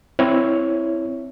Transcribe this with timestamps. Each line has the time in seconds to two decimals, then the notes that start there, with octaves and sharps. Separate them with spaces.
0.19 C4 E4 C#5